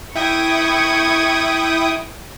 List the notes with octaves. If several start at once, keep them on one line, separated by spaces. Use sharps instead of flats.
E4 G5 C#6 D#6 G#6